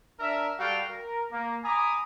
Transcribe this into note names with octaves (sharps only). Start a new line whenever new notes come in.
D4 A#4 E5
G3 F#4 A4 F5 G5
A#4
A#3
G#5 A#5 B5 D6 D#6